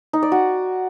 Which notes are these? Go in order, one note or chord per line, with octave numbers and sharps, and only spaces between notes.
D#4
D5
F#4